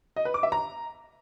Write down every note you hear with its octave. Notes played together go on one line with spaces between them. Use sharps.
D#5
B4
D6
E5
A#5